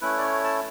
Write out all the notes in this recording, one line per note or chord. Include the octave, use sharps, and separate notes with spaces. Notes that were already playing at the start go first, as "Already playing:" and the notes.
A3 C#4 E4 B4
D5
C#5
A5